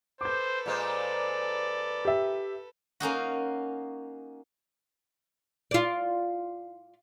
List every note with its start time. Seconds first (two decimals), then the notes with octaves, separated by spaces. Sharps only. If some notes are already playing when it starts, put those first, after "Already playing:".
0.21 A4 B4 C5 D6 G6
0.66 A#2 G#3 C5 D5
2.05 G4 E5
3.00 A#3 C#4 D#4 F#4
5.71 F4 D5